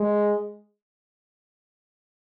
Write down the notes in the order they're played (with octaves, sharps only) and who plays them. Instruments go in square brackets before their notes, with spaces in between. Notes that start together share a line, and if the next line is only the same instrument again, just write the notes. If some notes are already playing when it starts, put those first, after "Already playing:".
Already playing: [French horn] G#3